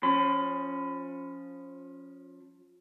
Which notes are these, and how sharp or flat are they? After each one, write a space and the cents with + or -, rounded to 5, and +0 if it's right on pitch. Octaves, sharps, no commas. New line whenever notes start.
F3 +25 C#4 +0 B5 +30